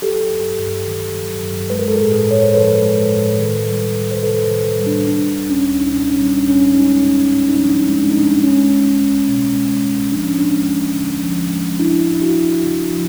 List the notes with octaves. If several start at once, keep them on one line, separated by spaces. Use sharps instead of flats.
F#3 G4 A4
G2
G2
D#3
F#3
G2
G#3 B4
A#4
A4
A2 G#4 A#4
G#4 A#4
A2 C#5
C5
F3 A4 B4
G#3
A2
D#3
G3
C2
C5
C3 A4 B4
D#3
G3
D4
G3 D4
C#2
C#4
C#2
D#4
B2 D4
C#4
G3
D4
C#2 C#4
D4
G#3 C#4 D#4
G#2
G#2
D#4
F3 D4
G#3
D4
G#2 D#4
D4
G#3 C#4
C2
C2
B2
G#3
C2
F3 D4
C#4
G#3 D4
D#2
D3
F3
G#3
F3 D4 E4
E2
E4 F#4
E2
C#3
F3